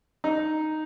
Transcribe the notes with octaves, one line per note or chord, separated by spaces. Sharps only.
D#4